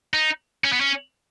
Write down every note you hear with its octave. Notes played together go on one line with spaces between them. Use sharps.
D#4
C#4
B3
C#4